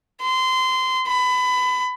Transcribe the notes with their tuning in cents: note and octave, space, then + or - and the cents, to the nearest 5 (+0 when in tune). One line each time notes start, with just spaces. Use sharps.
C6 -20
B5 +25